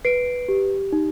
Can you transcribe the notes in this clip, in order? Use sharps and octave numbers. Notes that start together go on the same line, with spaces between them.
B4 C7 D7
G4
D#4